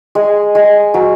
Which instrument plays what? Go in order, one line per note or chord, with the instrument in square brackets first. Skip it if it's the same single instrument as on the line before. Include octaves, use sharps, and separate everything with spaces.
[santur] G#3
G#3
F#3